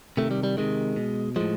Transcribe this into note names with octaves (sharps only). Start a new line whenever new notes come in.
C3 D#3 A3
G3
G3
C3 D#3 G#3
B2
A2 F3 G#3